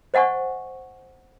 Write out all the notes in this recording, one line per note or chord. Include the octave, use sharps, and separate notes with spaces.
C5 D#5 F#5 G#5 C#6